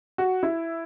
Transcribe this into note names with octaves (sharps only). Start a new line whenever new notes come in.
F#4
E4